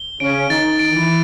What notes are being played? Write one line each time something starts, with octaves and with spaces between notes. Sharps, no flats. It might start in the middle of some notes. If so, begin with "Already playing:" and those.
Already playing: G7
C#3 C#4 D7
D#3 D#4 A6
D7
E3 E4